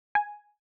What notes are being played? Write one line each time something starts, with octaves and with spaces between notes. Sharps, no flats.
G#5